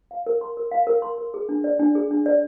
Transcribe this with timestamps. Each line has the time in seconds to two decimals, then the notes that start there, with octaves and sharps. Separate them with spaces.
0.11 F5
0.26 A#4
0.41 C6
0.57 A#4
0.71 F5
0.87 A#4
1.02 C6
1.18 A#4
1.34 G#4
1.49 D4
1.64 D5
1.80 D4
1.95 G#4
2.11 D4
2.26 D5